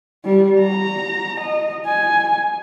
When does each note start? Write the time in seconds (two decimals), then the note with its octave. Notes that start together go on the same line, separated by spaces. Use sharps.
0.25 G3
0.59 A#5
1.40 D#5
1.86 G#5